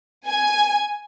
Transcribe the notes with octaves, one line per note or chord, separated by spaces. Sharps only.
G#5